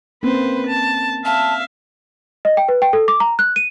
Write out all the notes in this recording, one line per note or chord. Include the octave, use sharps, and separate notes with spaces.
A#3 C4 C#4 B4 C5
A5
E5 F5 A5
D#5
G5
B4
G5
A4
D6
A#5
F#6
D#7